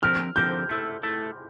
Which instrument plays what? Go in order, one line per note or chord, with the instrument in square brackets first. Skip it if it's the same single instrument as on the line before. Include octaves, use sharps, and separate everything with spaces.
[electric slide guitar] D3 F3 C4 G4 A#4 [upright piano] F6
[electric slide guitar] D3 F3 C4 G4 A#4 [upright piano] G6
[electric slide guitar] A3 E4 A4
A3 E4 A4